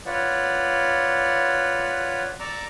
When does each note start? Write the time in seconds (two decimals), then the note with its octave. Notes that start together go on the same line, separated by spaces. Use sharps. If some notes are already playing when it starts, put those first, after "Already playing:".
0.06 F4 B4 C#5 D5 F#5
2.40 D5 A#5 C#6 D6 E6